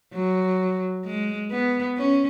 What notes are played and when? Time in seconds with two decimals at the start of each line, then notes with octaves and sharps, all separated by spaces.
0.13 F#3
1.05 G#3
1.51 B3
1.97 C#4